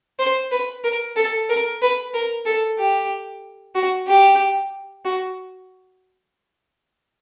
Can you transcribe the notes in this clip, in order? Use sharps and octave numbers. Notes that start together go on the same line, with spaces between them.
C5
B4
A#4
A4
A#4
B4
A#4
A4
G4
F#4
G4
F#4